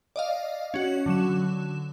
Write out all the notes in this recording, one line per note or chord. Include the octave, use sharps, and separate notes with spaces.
D5 D#5 F5
C#4 F#4
D3 F#3 E7